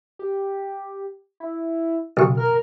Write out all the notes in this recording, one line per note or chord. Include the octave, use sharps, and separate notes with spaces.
G4
E4
B1 C#3 C#6
A#4 F6